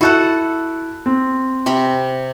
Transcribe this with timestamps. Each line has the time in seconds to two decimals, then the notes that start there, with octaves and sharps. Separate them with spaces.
0.01 E4 F#4 A4 F#5 F#6
1.06 C4
1.66 C3 G4 B5